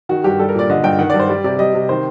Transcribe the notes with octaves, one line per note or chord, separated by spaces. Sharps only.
D#3 F#4
G2 G4
G3 A4
A#4
A#2 D5
D3 D#5
G2 G5
D#3 F#5
D5
G2
C5
G3 D5
C3 D5
G3 D#5
C3
D#3 C5